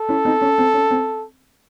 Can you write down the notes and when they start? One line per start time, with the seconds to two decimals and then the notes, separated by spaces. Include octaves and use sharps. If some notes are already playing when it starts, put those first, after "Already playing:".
Already playing: A4
0.09 C#4 E4
0.25 C4 D#4
0.41 C#4
0.58 C4
0.74 C#4
0.91 C4